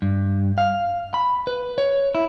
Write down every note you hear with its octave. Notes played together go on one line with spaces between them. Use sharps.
G2
F5
B5
B4
C#5
E4